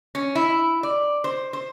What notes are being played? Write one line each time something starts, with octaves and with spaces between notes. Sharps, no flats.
C#4
E4
D5
C5
C5